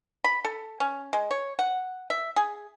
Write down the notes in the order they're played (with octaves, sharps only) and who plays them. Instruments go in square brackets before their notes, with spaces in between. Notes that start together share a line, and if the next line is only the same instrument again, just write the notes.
[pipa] B5
A4
C#4
G#3
C#5
F#5
E5
G#4